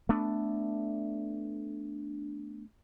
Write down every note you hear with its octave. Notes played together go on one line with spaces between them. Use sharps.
A3 B3 D4